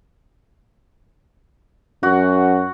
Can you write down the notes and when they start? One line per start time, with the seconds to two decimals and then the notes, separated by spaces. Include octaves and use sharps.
2.03 F#2 F#4